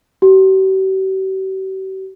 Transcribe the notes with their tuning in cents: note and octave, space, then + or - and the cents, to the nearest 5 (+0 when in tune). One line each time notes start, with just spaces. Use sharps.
G4 -45